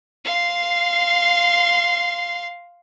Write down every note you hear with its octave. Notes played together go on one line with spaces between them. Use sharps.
F5 C6